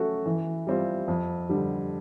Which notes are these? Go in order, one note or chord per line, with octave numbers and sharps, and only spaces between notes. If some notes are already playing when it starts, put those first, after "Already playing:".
Already playing: F#3 A3 C#4 F#4 A4
E3
G3 C4 F4
F2
D3 G3